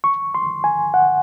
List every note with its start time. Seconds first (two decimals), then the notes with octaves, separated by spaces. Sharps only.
0.04 C#6
0.35 C6
0.64 G#5
0.94 F#5